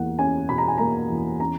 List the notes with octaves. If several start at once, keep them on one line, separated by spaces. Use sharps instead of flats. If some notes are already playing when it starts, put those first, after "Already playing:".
Already playing: E2 A#3 F#5
C#4 G#5
B2 B5
A#5
G#5
A#3 A#5
E2
C#4 A#5